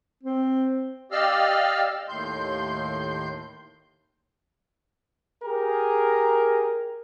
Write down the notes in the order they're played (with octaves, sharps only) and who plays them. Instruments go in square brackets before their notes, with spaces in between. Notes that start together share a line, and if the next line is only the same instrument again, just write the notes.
[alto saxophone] C4
[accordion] G4 D5 D#5 F5 E6 F6
D#2 A2 C6 G6
[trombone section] G4 G#4 A#4